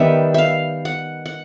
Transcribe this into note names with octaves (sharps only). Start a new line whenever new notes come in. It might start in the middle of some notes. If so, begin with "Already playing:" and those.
Already playing: D#3 G3 B3 E5
E5 F5
F#5
F#5